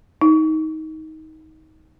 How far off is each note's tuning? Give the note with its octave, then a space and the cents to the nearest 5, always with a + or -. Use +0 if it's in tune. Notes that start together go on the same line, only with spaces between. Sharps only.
D#4 +20